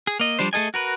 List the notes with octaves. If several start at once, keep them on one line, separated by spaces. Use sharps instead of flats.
G#4
A#3 D#5
F3 G3 D4 C5
A3 G#4 A4 D#5 G#5
F#4 A#4 B4